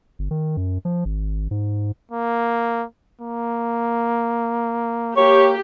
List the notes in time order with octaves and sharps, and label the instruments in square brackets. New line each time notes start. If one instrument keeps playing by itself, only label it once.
[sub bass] G1
D#3
F#2
F3
G#1
G#2
[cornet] A#3
[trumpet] A#3
[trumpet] A#3 [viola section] G4 [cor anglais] C#5